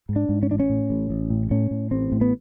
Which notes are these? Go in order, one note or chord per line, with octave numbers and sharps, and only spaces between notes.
G#2
D4
G#2
C#4
A1 D4
C#4
A2
A1
A1
A2
A2 C#4
A2
A1 C4
A2
B3